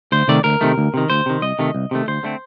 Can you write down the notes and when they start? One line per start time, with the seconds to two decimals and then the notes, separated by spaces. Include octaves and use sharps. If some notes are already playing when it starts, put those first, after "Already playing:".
0.12 D2 C5
0.28 C3 D#3 A3 D5
0.44 D2 A#4
0.61 C3 D#3 A3
0.78 D2
0.94 C3 D#3
1.10 D2 C5
1.26 C3 D#3
1.42 C2 D#5
1.59 C3 D#3 A3
1.75 C2
1.91 C3 D#3 A3
2.08 D2 C5
2.23 D3 A3 C4